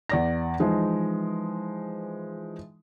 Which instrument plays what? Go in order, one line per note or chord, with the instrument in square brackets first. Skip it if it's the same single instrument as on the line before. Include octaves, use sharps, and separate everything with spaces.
[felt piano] E2 D5 A#6
E3 F3 G#3 D#4